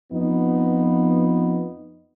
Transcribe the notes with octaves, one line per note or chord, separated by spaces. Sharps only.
F2 F3 B3 D#4